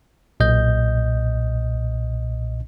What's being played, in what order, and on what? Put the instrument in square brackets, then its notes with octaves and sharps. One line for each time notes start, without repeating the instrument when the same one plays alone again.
[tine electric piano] B1 A#2 D#5 G6